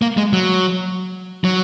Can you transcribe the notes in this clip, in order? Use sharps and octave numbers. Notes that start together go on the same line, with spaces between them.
A#3
G#3
F#3
F#3